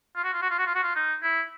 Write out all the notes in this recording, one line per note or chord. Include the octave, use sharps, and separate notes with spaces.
F4
F#4
F4
F#4
F4
F#4
F4
F#4
F4
D#4
E4